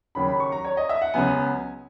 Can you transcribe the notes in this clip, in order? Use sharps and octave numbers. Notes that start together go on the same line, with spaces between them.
D#2 C#3 F#3 C#4 B5
B5
C#6
A#5
C#5
D#5
E5
F#5
C#2 C#3 F#3 B3 G#5